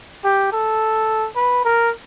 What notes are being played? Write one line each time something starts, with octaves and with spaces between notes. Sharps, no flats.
G4
A4
B4
A#4